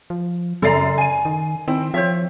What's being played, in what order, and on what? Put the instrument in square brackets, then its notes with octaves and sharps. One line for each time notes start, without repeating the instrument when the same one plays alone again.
[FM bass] F3
[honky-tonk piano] F#2 A6 C7 [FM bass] C#3 [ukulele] A4 D5 A#5
[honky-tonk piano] G#5 D#7
[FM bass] D#3
[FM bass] D#3 [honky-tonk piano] C4 [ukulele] E4
[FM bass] F3 [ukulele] C5 C#5 E5